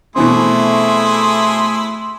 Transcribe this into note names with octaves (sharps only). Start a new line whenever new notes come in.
B2 E3 A3 C4 E4 G#4 C6